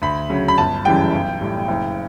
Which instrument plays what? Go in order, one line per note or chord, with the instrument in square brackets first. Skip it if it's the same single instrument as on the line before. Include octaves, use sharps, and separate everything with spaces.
[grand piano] D2 B5
C#3 F#3
B5
G1 A5
F#2 C#3 E3 G3 G5
B1
A2 G3
F#1